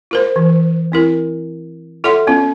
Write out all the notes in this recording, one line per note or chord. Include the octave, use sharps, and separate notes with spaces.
F4 A#4 C5
E3
C4 E4 A#4
F4 A4 C#5 E5 F#5 C6
B3 C#4 F4